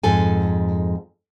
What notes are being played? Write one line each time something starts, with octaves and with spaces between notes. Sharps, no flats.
F2 G#2 A4 G#5